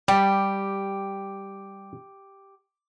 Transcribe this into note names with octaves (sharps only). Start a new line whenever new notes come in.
G3 G4